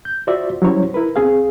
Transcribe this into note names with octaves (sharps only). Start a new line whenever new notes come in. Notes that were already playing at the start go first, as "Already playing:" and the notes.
G6
F4 F#4 C5 D5 E5
F#3 G3 C#4 E4 C5 C#5
E4 A#4 B4
C2 C4 G#4 F5